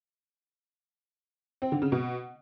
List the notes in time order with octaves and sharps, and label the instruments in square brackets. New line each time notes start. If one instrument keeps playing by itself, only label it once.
[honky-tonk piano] C4
D3
C#3
B2